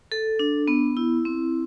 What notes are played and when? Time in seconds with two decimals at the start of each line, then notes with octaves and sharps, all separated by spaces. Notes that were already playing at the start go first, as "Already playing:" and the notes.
0.12 A4
0.39 D4
0.68 B3
0.97 E4
1.25 C4